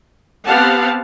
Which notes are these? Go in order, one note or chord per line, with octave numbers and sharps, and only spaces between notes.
B3 C4 G4 F5 F#5 A5